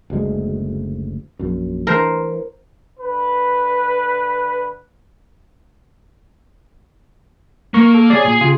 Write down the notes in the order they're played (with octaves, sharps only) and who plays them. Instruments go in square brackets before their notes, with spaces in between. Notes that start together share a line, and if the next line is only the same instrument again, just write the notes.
[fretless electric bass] F#1 D2 G#3
A#1 F#2
[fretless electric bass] E3 [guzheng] A#4 C5
[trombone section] D3 B4
[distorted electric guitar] A#3 [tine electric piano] A#4 C#6
[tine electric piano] A4
[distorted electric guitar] G#4 G#5 [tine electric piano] C#5 D5
[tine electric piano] A#2
C#3 F4 G4